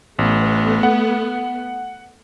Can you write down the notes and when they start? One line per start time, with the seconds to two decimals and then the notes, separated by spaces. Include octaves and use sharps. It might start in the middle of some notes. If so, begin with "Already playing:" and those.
0.19 A1 A3 B3
0.83 F#5